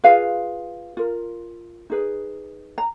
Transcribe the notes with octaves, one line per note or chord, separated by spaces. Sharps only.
F4 G#4 B4 F5
F4 A#4
D#4 G#4 B4
A#5